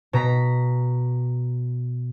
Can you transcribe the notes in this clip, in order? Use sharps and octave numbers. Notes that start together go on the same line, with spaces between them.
B2 A#5 B6